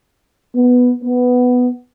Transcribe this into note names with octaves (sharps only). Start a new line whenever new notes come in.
B3
B3